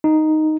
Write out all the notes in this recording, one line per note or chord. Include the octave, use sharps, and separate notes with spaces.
D#4